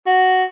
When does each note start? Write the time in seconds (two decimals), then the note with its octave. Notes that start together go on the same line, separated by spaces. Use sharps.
0.06 F#4